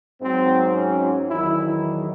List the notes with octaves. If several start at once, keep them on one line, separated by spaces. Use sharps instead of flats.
G#2 F#3 C4
C#4
E2 D#3 F#3 E4